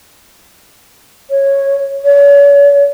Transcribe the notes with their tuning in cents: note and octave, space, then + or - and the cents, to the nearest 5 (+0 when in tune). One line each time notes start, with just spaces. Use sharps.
C#5 -10
C#5 +40